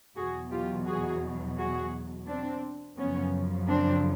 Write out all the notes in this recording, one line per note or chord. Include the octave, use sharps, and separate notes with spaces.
E2 B2 F#3 F#4 G#4
F4 G4
F#4 G#4
F#4 G#4
C4 D4
F#2 C#3 F3 B3 C#4
C4 D4